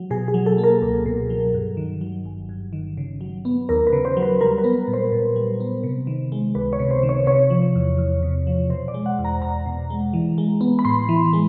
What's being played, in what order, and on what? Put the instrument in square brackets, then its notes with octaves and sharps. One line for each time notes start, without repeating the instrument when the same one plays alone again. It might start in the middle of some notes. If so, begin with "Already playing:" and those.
Already playing: [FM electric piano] F#3
B2 G#4
G#4
F#3
A4
A#3
A#4
C#2
B2
F#3
G2
D#3
F#3
G1
G2
D#3
C#3
F#3
B3
D#2 A#4
B4
C#3
C5
F#3
B4
G3 A#4
B4
B3
A#2
C5
A#2
G3
B3
C3
D#3
G#3
C#2 B4
C#5
C3
C5
D#3
C#5
C3 C#5
F3
E2
E2
C3
F3
B2 C5
D5
G#3
F#5
E2
A#5
E2 A#5
B2
G#3
E3
G#3
B3
B5
A2 C6
E3
G#3